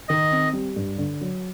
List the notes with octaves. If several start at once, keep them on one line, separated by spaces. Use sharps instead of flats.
D#3 D#5
C4
G3
G2
D3
F#3